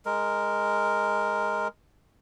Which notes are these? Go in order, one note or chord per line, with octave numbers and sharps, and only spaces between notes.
G#3 A#4